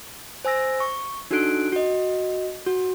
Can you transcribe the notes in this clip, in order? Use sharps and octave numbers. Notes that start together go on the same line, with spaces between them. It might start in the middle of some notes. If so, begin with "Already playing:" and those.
C5 G#5 E6 A#6
C#6
D4 D#4 F#4 A4 F#6 D7
F#4 D#5
F#4